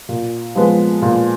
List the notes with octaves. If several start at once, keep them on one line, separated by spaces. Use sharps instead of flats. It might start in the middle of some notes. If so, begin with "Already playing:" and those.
A#2
F3 G#3 B3
A#2